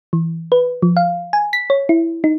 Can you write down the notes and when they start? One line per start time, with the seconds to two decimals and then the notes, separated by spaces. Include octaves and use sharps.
0.13 E3
0.52 B4
0.82 F3
0.97 F5
1.33 G#5
1.53 B6
1.70 C#5
1.89 E4
2.24 D#4